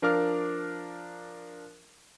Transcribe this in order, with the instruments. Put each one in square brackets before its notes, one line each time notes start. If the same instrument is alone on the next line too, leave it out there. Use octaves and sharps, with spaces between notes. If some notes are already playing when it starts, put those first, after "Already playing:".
[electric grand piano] F3 D4 A#4 F5 D6 F6